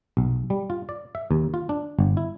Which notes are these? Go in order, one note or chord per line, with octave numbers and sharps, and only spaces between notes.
B1
G3
F4
D5
E5
D#2
F4
D4
G1
E4